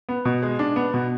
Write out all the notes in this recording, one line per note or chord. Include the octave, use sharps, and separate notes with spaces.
B3
B2
G#3
D4
B3
B2